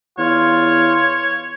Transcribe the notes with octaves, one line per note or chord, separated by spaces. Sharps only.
E2 F4 C#5